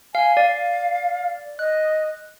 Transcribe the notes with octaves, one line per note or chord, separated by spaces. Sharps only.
F5 G#5
D5 F5
D#5 F#6